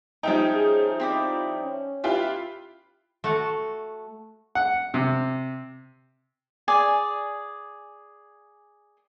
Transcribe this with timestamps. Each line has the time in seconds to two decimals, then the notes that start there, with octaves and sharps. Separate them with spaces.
0.23 F3 G3 C#4 D#4 E5 G5
0.54 G#4
1.00 C4 E4 F4 D5
1.62 C#4
2.04 E4 F4 G4 B4
3.24 A3 F#4
4.55 F#5
4.94 C3
6.68 G#4 D5 G#5